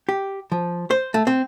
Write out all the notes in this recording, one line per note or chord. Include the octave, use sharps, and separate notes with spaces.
G4
F3
C5
A3
C4